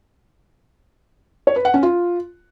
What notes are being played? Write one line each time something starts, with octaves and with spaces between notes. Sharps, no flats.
C#5
B4
F#5
C#4
F4